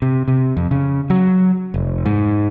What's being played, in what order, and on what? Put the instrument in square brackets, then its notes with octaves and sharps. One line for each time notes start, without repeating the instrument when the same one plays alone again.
[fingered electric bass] C3
C3
F2
C#3
F#3
F1
G#2